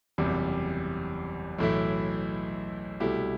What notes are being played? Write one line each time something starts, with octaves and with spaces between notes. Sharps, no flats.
F#1 E2 C3 G3
B1 A2 E3 A3 E4
C2 B2 A3 E4 G4